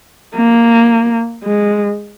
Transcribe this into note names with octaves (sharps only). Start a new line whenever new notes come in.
A#3
G#3